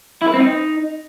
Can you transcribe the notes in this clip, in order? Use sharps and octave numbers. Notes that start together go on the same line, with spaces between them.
E4
B4
C4
D#4